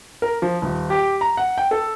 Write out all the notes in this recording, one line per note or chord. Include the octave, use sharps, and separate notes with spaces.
A#4
F3
D#1
G4
A#5
F#5
G5
A4